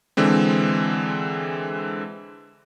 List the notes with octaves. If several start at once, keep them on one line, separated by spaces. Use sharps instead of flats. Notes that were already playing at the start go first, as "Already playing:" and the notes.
D3 E3 G#3 C4